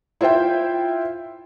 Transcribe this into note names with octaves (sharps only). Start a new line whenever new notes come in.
E4 F4 C5 E5 G5